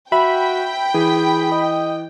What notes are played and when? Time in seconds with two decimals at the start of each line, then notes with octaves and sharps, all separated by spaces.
0.12 F#4 E5 G5 B5
0.94 E3 G#4
1.52 D#5